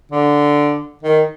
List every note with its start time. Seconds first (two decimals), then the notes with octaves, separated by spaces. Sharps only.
0.11 D3
1.03 D#3